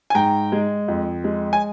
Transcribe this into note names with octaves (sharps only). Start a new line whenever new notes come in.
G#5
G#2 G5 A#5
G#3
F2
G#3
G#5